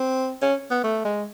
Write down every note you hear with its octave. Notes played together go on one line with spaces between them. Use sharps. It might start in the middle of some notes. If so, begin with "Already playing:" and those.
Already playing: C4
C#4
B3
A3
G#3